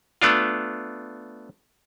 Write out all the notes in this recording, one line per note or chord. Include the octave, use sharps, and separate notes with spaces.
A3 B3 D4 F4